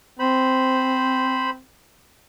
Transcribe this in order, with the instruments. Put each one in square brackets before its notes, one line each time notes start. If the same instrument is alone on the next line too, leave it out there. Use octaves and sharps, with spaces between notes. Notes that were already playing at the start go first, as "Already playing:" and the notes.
[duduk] C4 [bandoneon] C5 B5